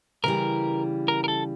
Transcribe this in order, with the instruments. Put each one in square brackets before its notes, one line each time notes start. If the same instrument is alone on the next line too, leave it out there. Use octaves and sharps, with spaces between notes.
[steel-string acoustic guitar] C#3 E3 G3 [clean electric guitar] A#4
[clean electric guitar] A#4
A#4
A4